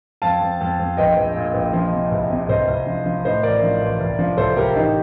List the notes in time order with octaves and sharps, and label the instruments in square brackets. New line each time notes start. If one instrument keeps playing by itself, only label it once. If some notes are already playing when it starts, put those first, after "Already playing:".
[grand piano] F2 F5 A5
F2
F2
F2
A#1 D#5 G5
A#1
A#2
A#1
F3
C3
C2
C3
C2 C5 D#5
C2
F3
F3
A2 C5 D#5
A1 A#4 D5
F3
A1
C2
F3
C2 A4 C5
C2 G4 A#4
A1 D#4 G4